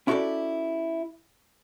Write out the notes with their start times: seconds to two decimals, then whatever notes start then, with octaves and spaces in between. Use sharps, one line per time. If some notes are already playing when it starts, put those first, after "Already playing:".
0.07 C#4 E4 F#4 G4 A4 D5